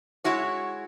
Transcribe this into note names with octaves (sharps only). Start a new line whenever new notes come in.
G#3 E4 F#4 C#5